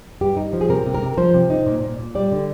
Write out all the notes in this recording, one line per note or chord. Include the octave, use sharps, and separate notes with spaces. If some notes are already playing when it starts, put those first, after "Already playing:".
G2 G4
D#4
F3
G#4
C3 A#4
C3
A#4
C3
F3 C5
C3
D#4
A#2
A#2
A#2
G3 D5
D3